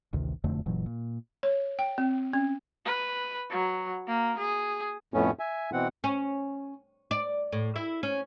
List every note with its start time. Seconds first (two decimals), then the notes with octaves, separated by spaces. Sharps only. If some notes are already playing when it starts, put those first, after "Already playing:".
0.13 A1 D2 C3 D#3
0.44 E1 F2 D3 A3
0.66 F#1 A#2 E3 F#3
0.86 A#2
1.43 C#5
1.79 G5
1.98 C4
2.33 C#4
2.85 B4
3.50 F#3
4.07 A#3
4.38 G#4
5.14 F2 A2 A3 B3 C#4
5.39 E5 G#5
5.73 B2 E3 C4 F#5
6.04 C#4
7.11 D5
7.52 A2
7.76 E4
8.03 C#4